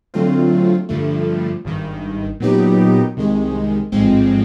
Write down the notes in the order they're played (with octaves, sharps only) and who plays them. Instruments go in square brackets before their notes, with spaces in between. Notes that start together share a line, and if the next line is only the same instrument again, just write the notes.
[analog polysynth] D3 F#3 A3 C4 F4
G2 D3 F3 A3
G#1 G2 D#3
A#2 F#3 B3 D#4 G4
C2 C3 D#3 G#3
A1 G#2 F3 G#3 C4